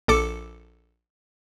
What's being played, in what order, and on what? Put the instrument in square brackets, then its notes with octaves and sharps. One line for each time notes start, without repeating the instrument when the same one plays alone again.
[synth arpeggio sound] A#1 A4 D6 C#7